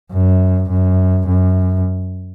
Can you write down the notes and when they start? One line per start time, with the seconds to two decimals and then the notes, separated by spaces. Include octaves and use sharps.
0.12 F#2
0.70 F#2
1.27 F#2